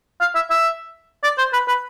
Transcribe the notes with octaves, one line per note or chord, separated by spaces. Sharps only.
F5
E5
E5
D5
C5
B4
B4